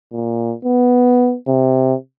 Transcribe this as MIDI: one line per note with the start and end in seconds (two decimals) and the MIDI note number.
0.12 0.54 46
0.65 1.36 59
1.48 1.94 48